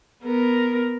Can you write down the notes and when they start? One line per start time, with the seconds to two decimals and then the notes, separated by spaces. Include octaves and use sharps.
0.24 B3 A#4